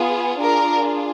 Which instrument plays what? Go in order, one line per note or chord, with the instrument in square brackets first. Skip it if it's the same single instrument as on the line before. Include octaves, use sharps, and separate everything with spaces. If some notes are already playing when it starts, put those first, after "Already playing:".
Already playing: [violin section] B3 F4 G#4
D4 F4 G#4 A#4